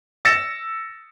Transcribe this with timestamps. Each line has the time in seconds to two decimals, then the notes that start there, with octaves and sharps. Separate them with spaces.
0.25 E6 A6 A#6 C#7 E7